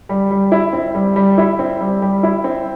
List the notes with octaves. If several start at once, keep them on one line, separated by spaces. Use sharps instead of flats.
G3
G3
E4
C4
G3
G3
E4
C4
G3
G3
E4
C4